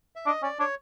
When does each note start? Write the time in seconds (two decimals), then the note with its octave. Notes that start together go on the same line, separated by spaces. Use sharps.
0.16 E5
0.26 D4 D#5
0.42 C#4 D5
0.59 D4 C#5